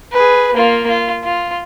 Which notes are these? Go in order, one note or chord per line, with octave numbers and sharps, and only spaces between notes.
G#4 B4
A#3 F4
F4
F4